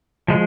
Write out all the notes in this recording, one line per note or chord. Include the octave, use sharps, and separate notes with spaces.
F3 G#3